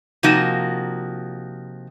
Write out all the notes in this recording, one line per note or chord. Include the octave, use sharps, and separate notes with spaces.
C3 F3 A#3 D#4 F#4